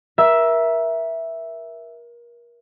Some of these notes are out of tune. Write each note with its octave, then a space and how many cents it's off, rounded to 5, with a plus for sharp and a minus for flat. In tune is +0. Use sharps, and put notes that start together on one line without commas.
A#4 +30 E5 +0